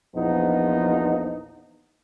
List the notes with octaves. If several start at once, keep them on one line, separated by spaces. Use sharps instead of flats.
A#1 E2 F3 B3 D#4